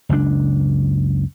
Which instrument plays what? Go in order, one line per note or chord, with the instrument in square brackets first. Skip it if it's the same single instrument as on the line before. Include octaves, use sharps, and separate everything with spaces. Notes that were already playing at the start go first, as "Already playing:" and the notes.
[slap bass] F#1 C#2 A2 D4